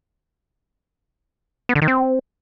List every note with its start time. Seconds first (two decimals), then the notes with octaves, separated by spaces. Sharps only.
1.69 B3
1.75 D3
1.82 D#3
1.88 C4